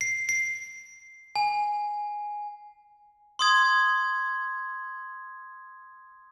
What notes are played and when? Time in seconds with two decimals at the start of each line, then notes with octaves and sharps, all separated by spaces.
0.01 C7
0.29 C7
1.36 G#5
3.39 C6 D#6 G#6